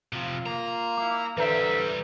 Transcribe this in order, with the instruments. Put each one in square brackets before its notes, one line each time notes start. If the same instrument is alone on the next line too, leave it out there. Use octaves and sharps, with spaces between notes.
[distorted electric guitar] C3 F3 [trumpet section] F4
[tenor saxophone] A#3 [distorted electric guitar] A#5
[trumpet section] E4 F5 [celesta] D6
[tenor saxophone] D3 [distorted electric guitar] E3 G3 [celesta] B4 A#5 [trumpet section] C5 E5